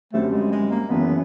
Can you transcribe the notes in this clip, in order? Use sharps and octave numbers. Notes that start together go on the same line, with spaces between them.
F#2 D3 G3 A3 C4
G#3
G#3
A#3
F#1 F#2 C#3 E3 B3